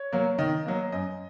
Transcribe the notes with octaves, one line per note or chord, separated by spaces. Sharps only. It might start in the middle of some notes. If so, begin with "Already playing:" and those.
Already playing: C#5
F#3 A#3
D#3 D#5
F#3 A#3
F#2 D#5